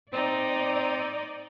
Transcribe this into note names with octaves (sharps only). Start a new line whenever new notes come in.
C4 D#4 D5